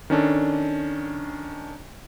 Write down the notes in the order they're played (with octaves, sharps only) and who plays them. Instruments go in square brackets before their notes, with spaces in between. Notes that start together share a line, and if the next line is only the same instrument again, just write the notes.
[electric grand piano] D#3 C#4 D4 A4